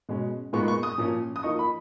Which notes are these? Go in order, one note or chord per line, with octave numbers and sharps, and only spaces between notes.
B2 G#3 C#4
A#2 G#3 B3 D#4 C#6
C#6
D#6
A#2 F3 A#3 C#4
D#6
F3 A#3 D#4 C#6
B5